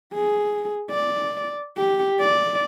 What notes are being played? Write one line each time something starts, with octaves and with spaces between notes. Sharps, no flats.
G#4
D5
G4
D5